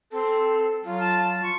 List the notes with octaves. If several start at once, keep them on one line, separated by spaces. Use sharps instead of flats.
C4 A4
F#3 F4
A5
F4 C#6